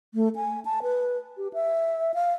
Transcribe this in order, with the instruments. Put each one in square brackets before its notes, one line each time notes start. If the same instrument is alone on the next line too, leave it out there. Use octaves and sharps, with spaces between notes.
[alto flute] A3
G#5
A5
B4
G4
E5
F5